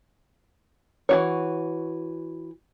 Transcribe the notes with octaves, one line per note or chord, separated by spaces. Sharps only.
E3 F#4 C#5